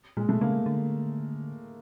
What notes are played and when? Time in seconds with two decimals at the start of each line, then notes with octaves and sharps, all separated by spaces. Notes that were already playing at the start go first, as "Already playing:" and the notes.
0.17 A#2 G#3
0.29 B2 A3
0.41 C#3 A#3
0.66 D3